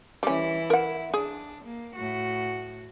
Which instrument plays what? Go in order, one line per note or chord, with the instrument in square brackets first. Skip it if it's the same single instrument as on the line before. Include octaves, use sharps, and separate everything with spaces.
[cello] E3 E4 [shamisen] G3 C#4
[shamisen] A#4 F#5
[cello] D4 [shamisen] G#4
[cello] A#3
A2 F#4